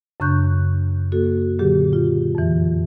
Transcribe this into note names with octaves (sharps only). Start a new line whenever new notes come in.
F#2 C#3 D4 C#6 F#6 G6
A#3 F#4 A4
A#2 D3 F#3 G4 G#4
F4
F2 E3